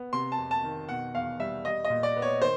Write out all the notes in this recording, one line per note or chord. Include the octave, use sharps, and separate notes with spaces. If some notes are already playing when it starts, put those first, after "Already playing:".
Already playing: B3
C3 C6
A5
F2
A5
D#3
B2 F#5
E2 F5
G3 E5
G3 D#5
D#5
A#2
D5
B3
C#5
D#3 C5